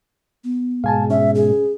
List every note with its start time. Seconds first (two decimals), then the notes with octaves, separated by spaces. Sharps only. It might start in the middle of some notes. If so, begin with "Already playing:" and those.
0.44 B3
0.84 G#2 B2 G#3 F5 G#5 A5
1.10 C#4 E5
1.35 G#4